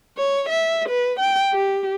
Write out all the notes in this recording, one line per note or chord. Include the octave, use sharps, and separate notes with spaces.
C#5
E5
B4
G5
G4